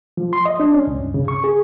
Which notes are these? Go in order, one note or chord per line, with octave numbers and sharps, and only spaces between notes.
F3
C6
D#5
D4
C#4
C#2
G2
C#3
C#6
G#4